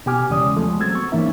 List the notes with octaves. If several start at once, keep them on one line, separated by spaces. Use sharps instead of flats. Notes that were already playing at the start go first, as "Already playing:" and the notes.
B2 B3 G4 G#5 D6 F6
E2 C#3 G#3 C#4 D5 D#6
F3 G#3 A3
F#3 C4 E6 G#6 A6
B3 C#6
G#2 E3 A#3 C#4 D#4 E5